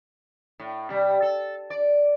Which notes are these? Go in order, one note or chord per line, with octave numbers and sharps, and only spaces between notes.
A2
C3 G3
A4
D5